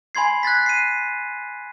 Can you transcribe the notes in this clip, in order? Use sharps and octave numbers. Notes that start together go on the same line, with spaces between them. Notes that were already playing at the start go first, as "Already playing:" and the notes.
G#5 B5 C6 G#6 C7
F#6 G#6 A6 B6
C7 D#7